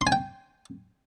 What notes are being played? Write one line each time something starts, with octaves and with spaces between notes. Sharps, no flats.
C6
G#5
G5